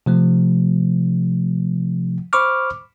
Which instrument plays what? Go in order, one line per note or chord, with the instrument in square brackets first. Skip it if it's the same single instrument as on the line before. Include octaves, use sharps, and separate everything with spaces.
[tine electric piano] C3 F3 A3
C5 B5 C#6 D6 F6